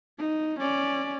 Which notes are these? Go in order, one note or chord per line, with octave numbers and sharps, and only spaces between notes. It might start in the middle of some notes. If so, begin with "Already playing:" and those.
D#4
C#4 D5